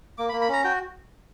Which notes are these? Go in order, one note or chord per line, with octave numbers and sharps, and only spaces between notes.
A#3 D6
B5
A#3
B5
C#4 A#5
F#4 G5